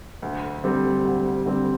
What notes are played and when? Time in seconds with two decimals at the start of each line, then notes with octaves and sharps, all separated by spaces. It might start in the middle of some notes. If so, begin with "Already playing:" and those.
0.22 D2
0.64 D3 G3 C4
1.04 D2
1.46 D3 G3 C4